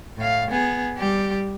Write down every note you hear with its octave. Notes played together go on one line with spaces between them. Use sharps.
A2 F5
B3 G#4
G3 G4